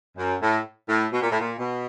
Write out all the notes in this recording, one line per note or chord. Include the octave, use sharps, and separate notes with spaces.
F#2
A2
A2
B2
A#2
A2
A#2
B2